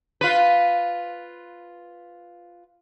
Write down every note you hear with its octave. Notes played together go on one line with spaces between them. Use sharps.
F4 B4